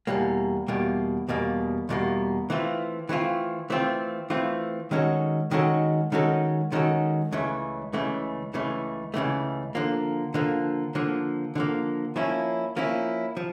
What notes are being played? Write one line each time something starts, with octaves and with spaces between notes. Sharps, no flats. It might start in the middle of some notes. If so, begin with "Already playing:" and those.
E2 B2 G3 A#3
E2 B2 G3 A#3
E2 B2 G3 A#3
E2 B2 G3 A#3
E3 A3 C4 F4
E3 A3 C4 F4
E3 A3 C4 F4
E3 A3 C4 F4
D#3 G#3 C#4 F#4 A4
D#3 G#3 C#4 F#4 A4
D#3 G#3 C#4 F#4 A4
D#3 G#3 C#4 F#4 A4
C#2 C#3 E3 A3
C#2 C#3 E3 A3
C#2 C#3 E3 A3
C#2 C#3 E3 A3
D3 F3 A#3
D3 F3 A#3
D3 F3 A#3
D3 F3 A#3
F3 A#3 C#4 E4
F3 A#3 C#4 E4
F3